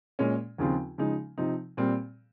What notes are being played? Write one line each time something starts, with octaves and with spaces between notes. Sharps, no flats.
A#2 G#3 C#4
D#2 C#3 F3 C4 F4
C#3 F3 G#3 D#4
C3 F3 C4 D#4
A#2 G3 C4